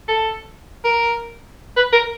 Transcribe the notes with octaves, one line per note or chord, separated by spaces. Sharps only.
A4
A#4
B4
A#4